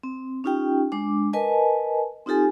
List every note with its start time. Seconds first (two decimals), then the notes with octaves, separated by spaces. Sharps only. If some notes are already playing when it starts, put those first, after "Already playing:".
0.03 C4
0.44 C#4 D#4 F4 G4 G5
0.92 G#3 D4 D6
1.33 A#4 B4 D#5 G#5 A5
2.26 C4 D#4 F4 G4 A4 G#5